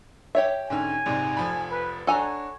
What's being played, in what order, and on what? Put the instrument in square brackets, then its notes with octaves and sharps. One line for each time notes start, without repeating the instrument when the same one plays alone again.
[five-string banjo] G4 C#5 E5
[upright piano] G#2 D3 C#4 [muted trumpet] G#5
[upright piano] A#1 G#2 C3
F1 F3 B5
[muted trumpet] B4
[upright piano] D4 F#4 [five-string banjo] A4 G#5 A#5 [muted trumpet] C#5